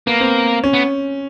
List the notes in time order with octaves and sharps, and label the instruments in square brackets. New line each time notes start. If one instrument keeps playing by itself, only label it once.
[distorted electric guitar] A#3 [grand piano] B3
[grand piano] C4
C#4
[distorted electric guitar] B3